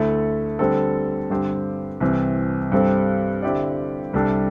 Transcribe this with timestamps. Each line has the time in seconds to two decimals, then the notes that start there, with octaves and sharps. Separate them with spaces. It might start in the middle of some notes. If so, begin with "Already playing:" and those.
Already playing: D2 D3 A3 E4 A4
0.59 D3 G3 C4 A4
1.30 G2 D3 C4 G4 C5
2.00 C2 C3 E3 C4
2.72 G2 G3 C4 A4
3.42 D3 C4 E4 G4 D5
4.13 C2 C3 G3 D4 A4